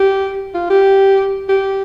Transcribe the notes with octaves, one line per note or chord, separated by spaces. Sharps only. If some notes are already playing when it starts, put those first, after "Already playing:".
Already playing: G4
F4
G4
G4